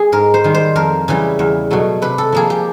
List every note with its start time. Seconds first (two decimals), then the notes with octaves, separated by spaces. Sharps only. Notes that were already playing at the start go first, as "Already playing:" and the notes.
Already playing: G#4
0.12 G#2 A#4
0.34 C5
0.44 D#3 G3
0.54 C5
0.75 F2 A#4
1.08 C#3 E3 G3
1.39 E2
1.70 B2 F#3 A3
2.02 C3 B4
2.18 A4
2.32 F3 A#3 G#4
2.50 G4